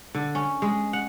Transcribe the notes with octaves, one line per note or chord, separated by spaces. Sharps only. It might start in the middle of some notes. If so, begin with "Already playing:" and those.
D3
C#4
G#3
F#5